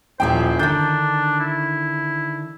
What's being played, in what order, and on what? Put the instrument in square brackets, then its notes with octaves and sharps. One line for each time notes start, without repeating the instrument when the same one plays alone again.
[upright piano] D#1 G5 [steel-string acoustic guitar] F3 C#4 E4 [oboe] C5
[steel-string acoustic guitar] D3 D#3 [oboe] D4 [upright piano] G6
[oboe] E4